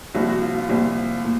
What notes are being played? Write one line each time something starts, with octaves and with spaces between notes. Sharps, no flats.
C2 A#2 F3 F#4
F#4
F4
F4
C2 A#2 F3
A#2